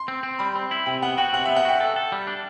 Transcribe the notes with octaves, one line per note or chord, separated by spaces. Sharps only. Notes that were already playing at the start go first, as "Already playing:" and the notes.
Already playing: C6
C4
C4
G3 B5
C4
E4
C3 G5
B3 F#5
F#4 G5
C3 F#5
B3 E5
F#5
F#4 G5
A4
A4
G3
D4